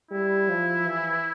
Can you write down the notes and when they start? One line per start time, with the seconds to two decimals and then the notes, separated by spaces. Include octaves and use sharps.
0.11 G3 E4
0.49 F3
0.87 E3